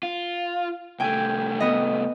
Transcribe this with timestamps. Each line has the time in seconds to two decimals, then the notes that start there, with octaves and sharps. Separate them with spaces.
0.03 F4
1.00 C2 A3 G5 G#5
1.60 B3 D#5